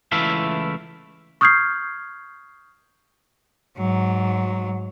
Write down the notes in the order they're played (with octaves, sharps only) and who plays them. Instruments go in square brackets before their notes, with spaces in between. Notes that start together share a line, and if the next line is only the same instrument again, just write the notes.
[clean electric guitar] C#2 E3 A3 E4 E5 F5
[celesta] C#6 D#6 F6 G6 G#6 C7
[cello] G#2 F#3